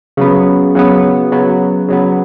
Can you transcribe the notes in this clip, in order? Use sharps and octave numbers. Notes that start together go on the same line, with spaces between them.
C#3 F#3 B3
C#3 F#3 B3
C#3 F#3 B3
C#3 F#3 B3